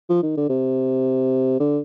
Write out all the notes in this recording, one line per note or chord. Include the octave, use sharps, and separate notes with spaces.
F3
D#3
D3
C3
D3